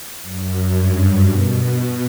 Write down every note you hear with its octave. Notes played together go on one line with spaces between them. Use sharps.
F#2
G2
B2